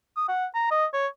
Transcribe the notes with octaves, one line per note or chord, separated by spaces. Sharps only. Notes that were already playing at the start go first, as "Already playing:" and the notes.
D#6
F#5
A#5
D#5
C#5